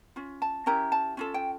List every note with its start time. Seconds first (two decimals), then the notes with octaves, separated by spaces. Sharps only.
0.16 C#4 F4
0.42 A5
0.66 C#4 E4 G4 A#4 A#5
0.92 A5
1.17 C#4 F4 A4
1.34 G5